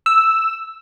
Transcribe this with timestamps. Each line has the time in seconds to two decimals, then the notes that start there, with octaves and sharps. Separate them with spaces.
0.06 E6